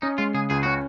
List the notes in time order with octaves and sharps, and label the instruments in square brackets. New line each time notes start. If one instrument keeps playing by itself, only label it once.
[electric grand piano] C#4 [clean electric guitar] D#4
[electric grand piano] G#3 [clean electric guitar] F4
[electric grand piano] C#3 [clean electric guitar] G#4
[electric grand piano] C#2 [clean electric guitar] G#4
[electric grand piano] C#4 [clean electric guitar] F#4